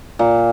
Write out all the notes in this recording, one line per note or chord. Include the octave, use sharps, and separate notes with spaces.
A#2